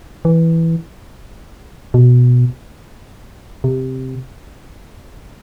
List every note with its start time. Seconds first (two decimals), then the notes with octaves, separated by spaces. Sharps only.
0.25 E3
1.94 B2
3.64 C3